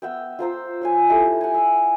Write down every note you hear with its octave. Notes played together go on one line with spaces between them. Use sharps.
B3 E5 G5
F4 C5 A#5 E6
C#5 F5 G#5
E4 G4 A4
F#5 G#5
E5